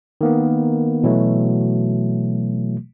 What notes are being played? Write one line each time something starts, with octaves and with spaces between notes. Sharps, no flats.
D#3 A#3 B3
B2 E3 F#3 A3